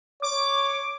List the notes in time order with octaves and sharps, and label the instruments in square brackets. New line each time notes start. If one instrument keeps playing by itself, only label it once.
[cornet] C#5 [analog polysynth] D6